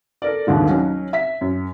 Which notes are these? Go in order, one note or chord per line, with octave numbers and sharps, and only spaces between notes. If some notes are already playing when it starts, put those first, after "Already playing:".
A4 A#4 D5
D#1 G#1 D#2 G#2 D3 D#3
F#3 C#4 D#4
E5 B6
F#2